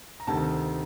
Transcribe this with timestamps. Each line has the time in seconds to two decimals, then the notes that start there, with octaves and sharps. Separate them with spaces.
0.20 A#5
0.27 D2 C3 D#3 A5